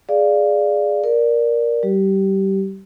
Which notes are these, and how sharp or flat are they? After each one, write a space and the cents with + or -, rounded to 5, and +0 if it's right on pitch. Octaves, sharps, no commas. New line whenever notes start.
G#4 +0 D5 +0 F5 -10
A#4 +10 D5 +5
G3 -25 G4 -20